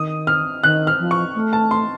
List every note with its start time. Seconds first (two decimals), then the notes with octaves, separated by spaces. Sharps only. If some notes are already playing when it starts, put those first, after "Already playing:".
Already playing: D#3 D#6
0.27 F6
0.63 D#3 F#6
0.87 F6
0.99 F3
1.11 C#6
1.34 A3
1.53 A5
1.71 C6